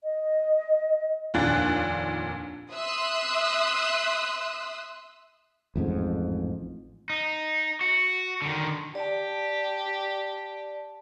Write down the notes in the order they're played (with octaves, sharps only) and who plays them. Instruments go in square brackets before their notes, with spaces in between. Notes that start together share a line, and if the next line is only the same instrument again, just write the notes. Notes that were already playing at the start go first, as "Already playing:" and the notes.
[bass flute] D#5
[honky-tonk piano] F1 D#2 A#2 D4 F#6 A6
[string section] E5 C6 D#6 E6 F#6
[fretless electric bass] A1 F2 G#2
[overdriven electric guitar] D#4
F#4
D3 D#3
[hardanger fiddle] G4 [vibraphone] D5 A5